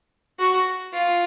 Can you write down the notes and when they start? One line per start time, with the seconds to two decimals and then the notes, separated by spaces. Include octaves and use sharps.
0.39 F#4
0.93 F4